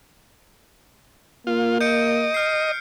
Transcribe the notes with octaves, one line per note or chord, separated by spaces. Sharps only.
A#3 F4
D#5 G6 C#7 D7
F6 C7